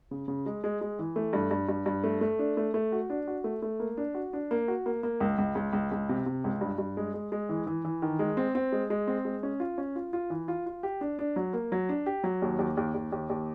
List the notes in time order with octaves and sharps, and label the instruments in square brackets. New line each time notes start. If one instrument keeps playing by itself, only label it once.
[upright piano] C#3
C#3
G#3
G#3
G#3
E3
A3
G2
G2
G2
G2
A3
A3
D4
A3
A3
F#4
D4
F#4
A3
A3
A#3
D4
F#4
D4
A#3
F#4
A#3
A#3
C#2
C#2
C#2
C#2
C#2
C3
C3
C#2
G2
G2
G#3
G#3
G#3
E3
E3
E3
D#3
G#3
C4
C4
G#3
G#3
C4
G#3
C#4
F4
C#4
F4
F4
E3
F4
F4
G4
D4
D4
F#3
A#3
F#3
D4
G4
F#3
D#2
D#2
D#2
D#2
D#2
D#2